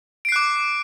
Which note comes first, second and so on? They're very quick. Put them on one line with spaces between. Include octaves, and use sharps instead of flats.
D7 C7 F#6 D6